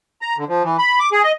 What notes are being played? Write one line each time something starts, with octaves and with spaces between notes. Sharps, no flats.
A#5
D3
F3
E3
B5
D6
G#4
D#5